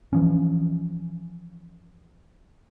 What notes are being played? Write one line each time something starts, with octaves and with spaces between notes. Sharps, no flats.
E3 F3 C#4